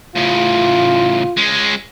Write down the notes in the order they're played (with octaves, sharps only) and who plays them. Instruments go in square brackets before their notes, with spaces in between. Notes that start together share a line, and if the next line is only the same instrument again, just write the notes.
[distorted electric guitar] A2 C#3 [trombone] F4
[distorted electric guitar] G#3 C#4